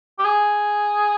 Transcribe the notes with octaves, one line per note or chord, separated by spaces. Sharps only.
G4
G#4